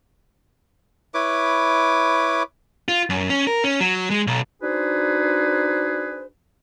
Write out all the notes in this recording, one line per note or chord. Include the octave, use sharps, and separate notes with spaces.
E4 B4 C#5 D6
F4
F#2
C#4
A#4
C#4
F#3
G#3
B1
D4 D#4 F#4 G#4 B4 C5